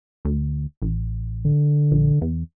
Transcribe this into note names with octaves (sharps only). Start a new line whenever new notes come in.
D2
A1
D3
A#1
E2